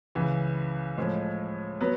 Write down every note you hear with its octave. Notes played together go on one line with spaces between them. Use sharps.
C#2 C#3 E3
A2 F3 G#3
F#3 B3